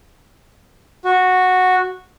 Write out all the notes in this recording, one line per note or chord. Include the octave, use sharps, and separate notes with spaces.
F#4